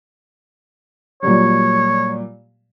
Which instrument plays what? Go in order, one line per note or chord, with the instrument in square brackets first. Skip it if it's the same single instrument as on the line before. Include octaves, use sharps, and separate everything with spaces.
[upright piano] A#2 F#3 G3 [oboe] C#5